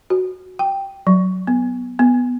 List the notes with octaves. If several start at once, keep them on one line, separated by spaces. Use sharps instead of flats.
F#4
G5
F#3
B3
B3